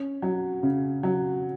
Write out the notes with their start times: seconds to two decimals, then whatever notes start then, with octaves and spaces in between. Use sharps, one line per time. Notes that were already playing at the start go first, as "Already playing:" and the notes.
Already playing: C#4
0.22 F#3
0.63 C#3
1.03 F#3